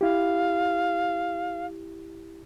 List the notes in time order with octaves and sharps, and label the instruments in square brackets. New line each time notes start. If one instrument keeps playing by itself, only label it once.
[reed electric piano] E4 G4 [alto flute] F5